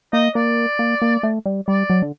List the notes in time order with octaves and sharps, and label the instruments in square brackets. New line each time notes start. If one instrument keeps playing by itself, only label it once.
[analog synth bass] A#3 [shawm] D#5
[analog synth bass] A#3 [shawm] D5
[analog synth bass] A#3
A#3
A3
G3
[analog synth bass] G3 [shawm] D5
[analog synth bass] F#3
D3